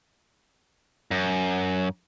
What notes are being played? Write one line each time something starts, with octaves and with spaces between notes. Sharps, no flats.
F#2